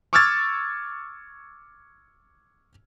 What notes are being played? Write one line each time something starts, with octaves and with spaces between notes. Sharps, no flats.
C#6 D6 E6 F6 G#6 A6